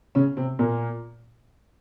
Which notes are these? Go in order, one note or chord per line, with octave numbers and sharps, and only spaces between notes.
C#3 C#4
C3 C4
A#2 A#3